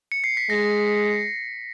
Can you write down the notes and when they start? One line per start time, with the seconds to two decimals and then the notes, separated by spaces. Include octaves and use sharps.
0.12 C#7
0.24 C7
0.37 B6
0.50 G#3 A#6